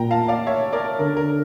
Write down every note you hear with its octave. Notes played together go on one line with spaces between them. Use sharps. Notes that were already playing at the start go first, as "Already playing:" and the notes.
Already playing: A#2 G5 A#5
F5 A5
D5 F5
C#5 E5
A#4 D5
D3 A#4
A#4